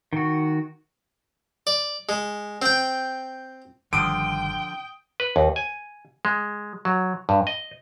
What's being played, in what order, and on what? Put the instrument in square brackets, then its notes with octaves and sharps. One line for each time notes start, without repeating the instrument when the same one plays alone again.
[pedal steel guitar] D#3 F#4
[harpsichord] D5
G#3
C4 G5
[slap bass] G1 D#3 G3 [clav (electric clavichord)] D3 F3 [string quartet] G5 [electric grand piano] D#6 D7
[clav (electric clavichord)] B4
D#2
G#5
G#3
F#3
G2
D#5